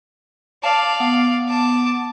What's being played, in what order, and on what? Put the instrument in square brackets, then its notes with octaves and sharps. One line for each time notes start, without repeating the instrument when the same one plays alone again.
[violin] D5 F5 [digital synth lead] A5
[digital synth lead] B3
[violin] A5 D6